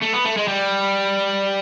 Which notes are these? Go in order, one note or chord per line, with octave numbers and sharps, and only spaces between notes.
A3
B3
A3
G#3
G3